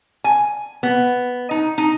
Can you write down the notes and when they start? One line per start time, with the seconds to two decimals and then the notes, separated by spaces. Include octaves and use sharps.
0.24 G#5
0.83 B3
1.51 D#4
1.78 D#4